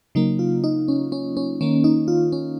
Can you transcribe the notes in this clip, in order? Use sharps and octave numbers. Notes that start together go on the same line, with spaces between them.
C#3 F#3 A#3 D#4
F4
D#4
C#4
C#4
C#4
D#3 A#3 C#4
D#4
F4
C#4